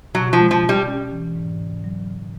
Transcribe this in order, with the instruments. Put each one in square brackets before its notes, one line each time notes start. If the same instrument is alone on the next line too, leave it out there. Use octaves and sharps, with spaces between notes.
[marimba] B2 [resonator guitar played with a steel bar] F#3
[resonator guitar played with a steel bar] F3
[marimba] G#3
[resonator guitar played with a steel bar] F3
[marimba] B2
[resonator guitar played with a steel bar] G3
[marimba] C#4
E3
G#2
C#3
F#3
C#3